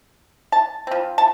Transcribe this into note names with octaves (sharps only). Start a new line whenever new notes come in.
A5
F3 C4
A5